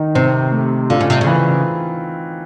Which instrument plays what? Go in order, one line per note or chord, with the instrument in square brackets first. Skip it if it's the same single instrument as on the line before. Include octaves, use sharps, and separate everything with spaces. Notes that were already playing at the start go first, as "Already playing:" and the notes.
Already playing: [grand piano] D#3 D#4
[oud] C3 [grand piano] C4
[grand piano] A3
[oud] D3 [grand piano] F4
[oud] C#3
C3
C#3
[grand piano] E3